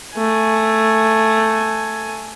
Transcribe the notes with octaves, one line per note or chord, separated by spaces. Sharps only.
A3 G#5